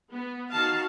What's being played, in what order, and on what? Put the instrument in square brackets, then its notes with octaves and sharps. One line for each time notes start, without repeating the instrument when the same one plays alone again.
[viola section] B3
D#3 F#4 F5 A5